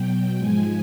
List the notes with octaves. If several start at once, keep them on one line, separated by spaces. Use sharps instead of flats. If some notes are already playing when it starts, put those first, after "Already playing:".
Already playing: B2 F#3 G5
G#2 F3 G#3 G#5